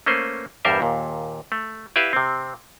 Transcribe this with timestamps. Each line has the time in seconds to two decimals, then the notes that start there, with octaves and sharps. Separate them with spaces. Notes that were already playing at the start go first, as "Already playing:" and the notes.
0.06 A3 A#3 C#4 B4 C5
0.65 E2 G2 G3 A#4 C5 E5
0.81 D#2 A#2
1.52 A3
1.96 E4 G4 B4 D5 E5 F5
2.13 C3 C4